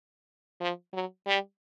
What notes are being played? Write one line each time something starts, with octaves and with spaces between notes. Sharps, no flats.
F3
F#3
G3